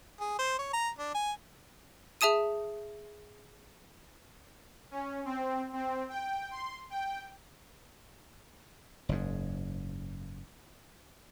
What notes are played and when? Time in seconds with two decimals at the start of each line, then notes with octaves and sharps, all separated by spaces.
0.20 G#4
0.39 C5
0.58 C#5
0.73 A#5
0.98 D4
1.14 G#5
2.21 G#4 E5 A5 D#6 D#7
4.91 C#4
5.25 C4
5.73 C4
6.09 G5
6.51 C6
6.90 G5
9.09 F#1 G#2